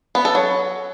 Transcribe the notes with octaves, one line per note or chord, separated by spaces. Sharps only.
B3
A4
F#3